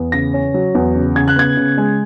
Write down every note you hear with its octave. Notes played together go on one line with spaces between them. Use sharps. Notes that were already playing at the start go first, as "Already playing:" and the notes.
Already playing: E2
C#3 A#6
C#4
F#3
E2
C#3
C#3 G#6
F#6
B3 G#6
C#3
G#3